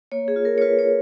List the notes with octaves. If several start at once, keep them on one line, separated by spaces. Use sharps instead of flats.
A#3 C#5
G#4
F4
A#4
C#5
F4 B4
C#5